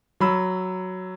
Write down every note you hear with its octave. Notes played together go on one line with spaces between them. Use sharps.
F#3 B5 E6